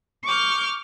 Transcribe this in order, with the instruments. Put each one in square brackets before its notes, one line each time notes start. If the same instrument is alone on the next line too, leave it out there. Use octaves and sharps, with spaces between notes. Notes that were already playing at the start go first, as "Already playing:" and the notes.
[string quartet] C#6 D6 F6 G6